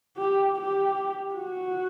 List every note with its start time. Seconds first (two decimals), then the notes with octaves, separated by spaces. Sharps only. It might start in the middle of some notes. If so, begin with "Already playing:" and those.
0.17 G4
0.57 G4
1.34 F#4